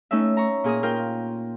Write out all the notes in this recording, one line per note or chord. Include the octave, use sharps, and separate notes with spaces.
A3 C#4 D#4 E5
A#5 C#6
A#2 G#4 A#4 D#6
F4 A#4 G5